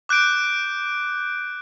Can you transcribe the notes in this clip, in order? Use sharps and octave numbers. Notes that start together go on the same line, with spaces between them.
D6 F#6 G6 D7